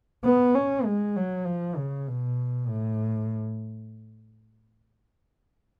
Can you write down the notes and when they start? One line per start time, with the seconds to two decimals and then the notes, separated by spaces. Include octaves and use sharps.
0.25 B3
0.55 C#4
0.85 G#3
1.16 F#3
1.46 F3
1.76 C#3
2.08 B2
2.68 A2